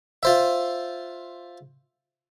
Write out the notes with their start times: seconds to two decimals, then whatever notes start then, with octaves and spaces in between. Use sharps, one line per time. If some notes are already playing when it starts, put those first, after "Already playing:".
0.23 F4 C5 E5